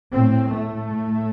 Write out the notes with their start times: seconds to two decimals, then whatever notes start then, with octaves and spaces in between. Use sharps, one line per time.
0.14 A2 C4
0.52 A3
0.90 A2